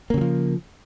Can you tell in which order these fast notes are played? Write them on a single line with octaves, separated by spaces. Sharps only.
A#3 C#3 F#3 F3